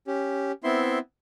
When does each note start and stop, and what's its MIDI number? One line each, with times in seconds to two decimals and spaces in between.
0.07 0.52 61
0.07 0.52 67
0.64 0.99 59
0.64 0.99 60
0.64 0.99 64
0.64 0.99 76
0.64 0.99 84